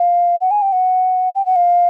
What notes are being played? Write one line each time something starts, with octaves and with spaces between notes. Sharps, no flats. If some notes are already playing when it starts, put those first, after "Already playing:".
Already playing: F5
F#5
G#5
G5
F#5
G5
F#5
F5